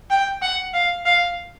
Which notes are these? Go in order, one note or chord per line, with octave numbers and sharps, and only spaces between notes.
G5
F#5
F5
F5